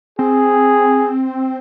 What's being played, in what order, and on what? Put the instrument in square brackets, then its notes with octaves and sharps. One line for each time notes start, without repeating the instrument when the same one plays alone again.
[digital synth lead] C4 [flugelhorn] G#4